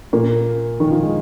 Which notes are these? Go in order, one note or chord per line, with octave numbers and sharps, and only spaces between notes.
A#2 A#3
D#3
F3
G#3